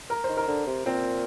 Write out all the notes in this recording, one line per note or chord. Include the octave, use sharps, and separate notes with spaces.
A#4
D#3 C5
A#4
D3
C3
A#2 C4